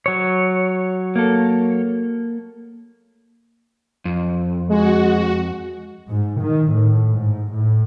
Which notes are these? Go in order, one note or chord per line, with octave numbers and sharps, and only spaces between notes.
F#3 C#5
A#3 A4
F2
G#3 F#4
G#2
D#3
A2
G#2
A2